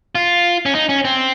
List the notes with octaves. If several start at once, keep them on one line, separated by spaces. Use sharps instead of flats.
F4
C#4
D#4
C#4
C4